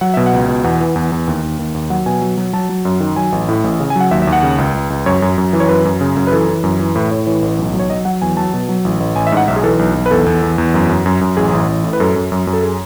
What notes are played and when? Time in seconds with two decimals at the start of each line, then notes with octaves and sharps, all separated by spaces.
0.01 F#3 F#5
0.14 B2 E5
0.26 F#5
0.33 C#2
0.48 B2
0.64 E2 F#5
0.80 E3
0.96 E2
1.12 E2
1.27 D#2
1.43 D#2
1.59 D#2
1.74 D#2
1.90 F#3 F#5
2.06 B2 G#5
2.22 F#3
2.37 F#3
2.53 F#3 A5
2.69 F#3
2.85 F#2
3.00 D#3
3.16 F#3 G#5
3.32 A1
3.48 A2
3.64 A1
3.80 C#3
3.90 G#5
3.96 F#3 F#5
4.11 D#2 E5
4.22 E5
4.27 D#2
4.33 F#5
4.43 C#3
4.58 C#2
4.74 C#2
4.90 C#2
5.06 F#2 C#5
5.22 F#2
5.38 F#2
5.53 E3
5.60 C#5
5.69 F#2 B4
5.85 F#2
6.01 C#3
6.17 F#2
6.27 B4
6.32 E3 A4
6.48 E3
6.64 F#2
6.79 E3
6.95 A2 B4
7.11 A2 C#5
7.27 E3 C#5
7.42 A1
7.59 B1
7.74 F#3
7.79 C#5
7.90 F#3 D#5
8.05 F#3 F#5
8.22 E2 G#5
8.37 F#3 A5
8.54 B2
8.69 F#3
8.85 A1
9.00 A1
9.16 A1 G#5
9.27 E5
9.32 G#2 F#5
9.48 B1 E5
9.56 G#4
9.63 E3 A4
9.79 B1
9.95 B1
10.06 B4
10.11 E2 A4
10.26 E2
10.42 E2
10.58 E2
10.74 F#2
10.89 F#2
11.06 F#2
11.21 F#2
11.37 A1 G#4
11.53 A1
11.68 A1
11.84 A2
11.93 B4
12.00 F#2 A4
12.16 F#2
12.32 F#2
12.47 F#2
12.53 A4
12.63 G#4